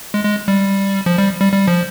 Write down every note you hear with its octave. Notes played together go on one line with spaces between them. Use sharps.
G#3
G#3
G3
F3
G3
G3
G3
F3